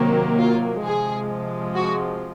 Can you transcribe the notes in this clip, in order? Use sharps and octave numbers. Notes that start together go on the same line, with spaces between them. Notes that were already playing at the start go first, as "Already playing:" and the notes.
Already playing: C3 D#3 F#3 A#3
F4
C3 F3 G#3 G#4
F#4